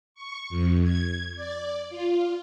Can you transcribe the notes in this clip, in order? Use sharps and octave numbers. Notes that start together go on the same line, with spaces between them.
C#6
F2
G#6
D5
F4